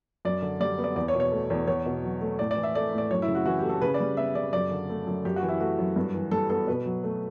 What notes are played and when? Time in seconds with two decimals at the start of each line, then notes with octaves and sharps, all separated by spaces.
0.25 F#2 D5
0.42 D3
0.60 G3 D5
0.78 B3
0.84 D5
0.96 E2 D5
1.08 C#5
1.15 B2
1.20 C#5
1.32 A3
1.50 E2
1.68 E2 C#5
1.86 B2
2.03 F#3
2.21 A3
2.39 A2 D5
2.51 D5
2.56 E3
2.63 E5
2.75 A3 D5
2.93 A2
2.98 D5
3.11 F#2 C#5
3.22 E4
3.28 C#3
3.35 F#4
3.46 E3 F#4
3.58 G4
3.63 A3
3.69 A4
3.82 C#3 B4
3.94 D5
4.00 G3
4.17 B3 E5
4.35 C#3 D5
4.53 F#2 D5
4.71 D3
4.90 A3
5.07 F#2
5.25 F#2 G4
5.36 F#4
5.43 E3
5.48 E4
5.61 A3 F#4
5.79 F#2
5.96 G2
6.14 E3
6.31 G3 A4
6.50 B3 A4
6.67 B2 B4
6.86 F#3
7.04 A3